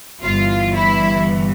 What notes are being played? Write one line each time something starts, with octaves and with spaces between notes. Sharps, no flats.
G1 G2 E3 F4
E4